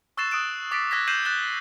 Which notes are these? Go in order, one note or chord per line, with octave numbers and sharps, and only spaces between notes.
C#6 E6 F#6 A6 C7 E7
D#6 F#6 D7 E7
D6 A6 B6 C7 D7
D6 E6 F#6 G#6 A#6 B6
G6 C7 D#7 E7 F#7
F#6 A6 E7 G7